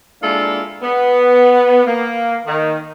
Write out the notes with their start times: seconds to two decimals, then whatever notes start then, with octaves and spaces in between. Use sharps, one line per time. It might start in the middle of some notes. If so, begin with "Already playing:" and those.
0.22 G#3 A#3 D4 E4 F4 A4
0.83 B3
1.86 A#3
2.46 D#3